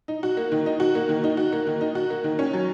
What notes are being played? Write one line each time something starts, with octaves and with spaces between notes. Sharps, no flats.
D#4
F#4
A#3
D#3
D#4
F#4
A#3
D#3
D#4
F#4
A#3
D#3
D#4
F#4
A#3
D#3
C#4
F#3